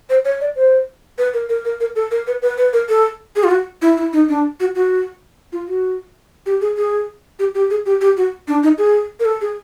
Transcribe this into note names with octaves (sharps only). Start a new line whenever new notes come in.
C5
C#5
D5
C5
B4
A#4
A#4
A#4
A#4
A4
A#4
B4
B4
B4
A#4
A4
G#4
F4
F#4
E4
E4
D#4
D4
F#4
F#4
F4
F#4
G4
G#4
G#4
G4
G4
G#4
G4
G4
F#4
D4
D#4
G#4
A#4
A4
G#4